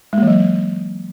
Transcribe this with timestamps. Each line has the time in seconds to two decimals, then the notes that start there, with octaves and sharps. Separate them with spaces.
0.13 G#3
0.18 A#3
0.23 E3
0.27 F#3